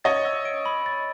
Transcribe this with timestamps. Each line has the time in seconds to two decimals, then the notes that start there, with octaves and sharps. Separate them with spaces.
0.04 C#5 D#5 A6
0.25 E6
0.45 D7
0.66 B5
0.86 A6